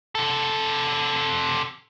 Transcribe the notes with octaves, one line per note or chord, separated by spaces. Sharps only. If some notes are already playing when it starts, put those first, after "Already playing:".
C3 A4